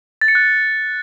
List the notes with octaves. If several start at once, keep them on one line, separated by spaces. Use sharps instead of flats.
A6
C#7
F#6